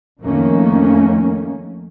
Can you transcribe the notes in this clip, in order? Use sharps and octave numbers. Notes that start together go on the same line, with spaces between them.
F2 D#3 F3 A3 A#3 C#4